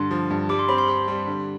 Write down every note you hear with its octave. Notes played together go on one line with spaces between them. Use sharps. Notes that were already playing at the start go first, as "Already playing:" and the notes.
Already playing: G2 D3 C6
F3
G2
G3 D6
C6
C4 B5
C6
G4
G3
D3